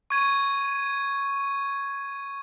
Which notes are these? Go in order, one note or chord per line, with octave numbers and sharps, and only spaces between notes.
C#6 G#6 D#7